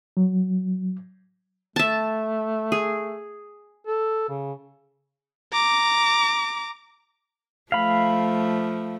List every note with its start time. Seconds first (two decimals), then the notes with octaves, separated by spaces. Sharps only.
0.17 F#3
1.76 A3 E5 A5
2.72 G#4
3.87 A4
4.29 C#3
5.53 A#5 D6
7.72 F3 A3 F5 B5